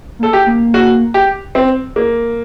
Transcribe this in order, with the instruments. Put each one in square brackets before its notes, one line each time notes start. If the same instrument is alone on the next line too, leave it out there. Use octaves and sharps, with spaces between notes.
[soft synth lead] A#3
[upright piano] A4
G4
[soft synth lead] A#3
[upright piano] F#4
G4
C4
A#3